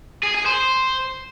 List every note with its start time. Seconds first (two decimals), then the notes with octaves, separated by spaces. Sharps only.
0.23 G#4
0.35 G#4
0.46 C5